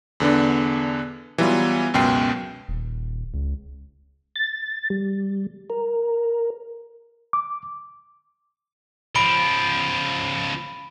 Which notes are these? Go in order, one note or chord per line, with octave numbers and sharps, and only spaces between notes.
E2 D3 B3 D4
E3 F#3 G3 B3 F4
C#2 F#2 B2 G5 C7
D#1
C#2
A6
G3
A#4
D6
C#2 F3 B5 D7 G7